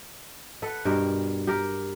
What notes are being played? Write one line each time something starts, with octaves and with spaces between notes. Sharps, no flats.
A4 B4 F#5
G2 B2 G4 A#4
G4 A#4